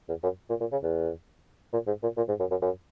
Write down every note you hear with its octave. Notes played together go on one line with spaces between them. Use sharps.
E2
F#2
A#2
A#2
C#3
E2
A#2
G#2
A#2
A#2
G#2
F#2
F#2
F#2